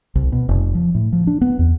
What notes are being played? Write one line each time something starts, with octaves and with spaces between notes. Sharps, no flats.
C2
B2
F1
F3
A2
F3
D4
B3
E2